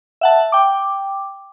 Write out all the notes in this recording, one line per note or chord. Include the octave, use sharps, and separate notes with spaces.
E5 F#5 A5
G5 D6